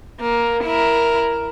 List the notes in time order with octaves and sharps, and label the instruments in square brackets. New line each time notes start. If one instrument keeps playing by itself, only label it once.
[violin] A#3
E4 A#4